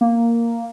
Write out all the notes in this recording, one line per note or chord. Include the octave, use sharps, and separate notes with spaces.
A#3